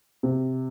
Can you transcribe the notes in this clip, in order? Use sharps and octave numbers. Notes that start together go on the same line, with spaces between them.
C3